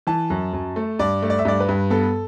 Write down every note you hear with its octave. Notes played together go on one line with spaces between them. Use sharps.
E3 A5
F#2
F#2
A3
G2 D5
A3
D5
E5
G2 D5
B4
G2
B3 A4